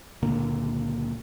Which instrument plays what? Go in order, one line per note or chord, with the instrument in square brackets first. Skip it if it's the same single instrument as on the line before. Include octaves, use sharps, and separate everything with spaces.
[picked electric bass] C#2 A#2 D3 A#3